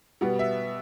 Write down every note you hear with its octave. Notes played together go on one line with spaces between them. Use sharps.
B2 G3 B3
E5